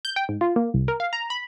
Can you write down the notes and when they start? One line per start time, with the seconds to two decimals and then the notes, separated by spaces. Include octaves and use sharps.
0.05 G6
0.16 G5
0.29 G#2
0.41 F4
0.56 A#3
0.74 C2
0.88 A#4
1.00 F5
1.13 A#5
1.30 B5